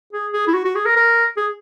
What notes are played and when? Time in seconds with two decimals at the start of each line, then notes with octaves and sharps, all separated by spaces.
0.13 G#4
0.33 G#4
0.47 E4
0.54 F#4
0.65 F#4
0.75 G#4
0.86 A#4
0.96 A#4
1.37 G#4